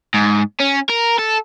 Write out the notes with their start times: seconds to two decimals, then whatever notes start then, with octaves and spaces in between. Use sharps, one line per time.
0.14 G#2
0.60 C#4
0.90 A#4
1.19 A4